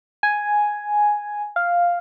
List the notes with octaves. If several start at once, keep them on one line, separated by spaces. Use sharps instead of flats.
G#5
F5